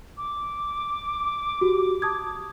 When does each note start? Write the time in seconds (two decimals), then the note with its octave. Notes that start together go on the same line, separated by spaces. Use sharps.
0.17 D6
1.61 F#4 G4
2.02 A5 D#6 G#6